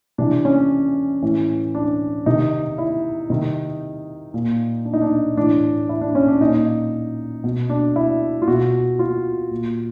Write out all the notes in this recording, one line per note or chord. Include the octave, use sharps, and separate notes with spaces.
C3 E3 D4
C#4
A2 E3
D4
C3 D#3 D#4
E4
C3 D#3 D#4
A#2
D4
D#4
D4
A2 E3 D4
E4
D4
C#4
D4
A#2 D#4
B2
D4
E4
F4
B2 F#4
F4
A#2